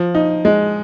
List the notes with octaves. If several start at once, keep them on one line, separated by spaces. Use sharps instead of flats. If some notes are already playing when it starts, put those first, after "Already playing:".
Already playing: F3
D#4
G#3